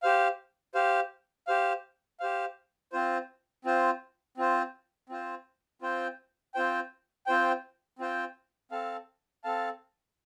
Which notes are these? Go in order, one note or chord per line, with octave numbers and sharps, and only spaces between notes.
G4 C5 F5
G4 C5 F5
G4 C5 F5
G4 C5 F5
C4 F4 C5
C4 F4 C5
C4 F4 C5
C4 F4 C5
C4 F4 C5 G5
C4 F4 C5 G5
C4 F4 C5 G5
C4 F4 C5 G5
C4 A4 F5 A5
C4 A4 F5 A5